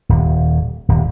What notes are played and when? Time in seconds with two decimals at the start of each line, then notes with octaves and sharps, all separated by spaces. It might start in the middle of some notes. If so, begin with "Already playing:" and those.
0.09 D#1
0.89 D#1